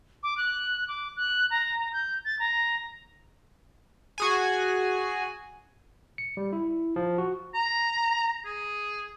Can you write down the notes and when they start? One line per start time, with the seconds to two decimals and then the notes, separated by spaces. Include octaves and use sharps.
0.23 D6
0.37 F#6
0.88 D6
1.17 F#6
1.50 A#5
1.79 A#5
1.93 G6
2.25 A6
2.39 A#5
4.18 F#4 G#4 G#5
6.18 C#7
6.37 G3
6.53 E4
6.96 F3
7.18 F#4
7.54 A#5
8.45 G#4